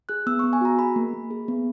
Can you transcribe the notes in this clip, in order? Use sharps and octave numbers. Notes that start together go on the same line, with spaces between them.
G#4 F#6
B3 E6
B3 C#6
G#5
F#4 A#5
G#4 B5
A#3
A#3
G#4
B3